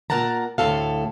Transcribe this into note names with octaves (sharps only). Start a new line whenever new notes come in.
A#2 D#3 A#4 F#5 A5 A#5
D2 A2 A4 F5